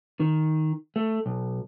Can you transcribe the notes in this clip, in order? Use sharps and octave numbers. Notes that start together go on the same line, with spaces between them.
D#3
A3
B1